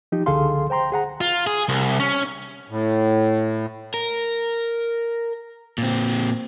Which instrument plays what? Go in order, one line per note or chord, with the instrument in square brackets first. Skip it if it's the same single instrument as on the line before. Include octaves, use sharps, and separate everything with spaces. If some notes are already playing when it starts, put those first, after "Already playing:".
[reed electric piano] F3 D#4 G4
C#2 D3 G#4 A4 F5 C6
C5 G5 A#5 C6
G#4 F#5 A#5
[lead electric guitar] F4
G#4
C2
C#4
[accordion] A2
[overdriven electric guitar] A#4
A#2 C4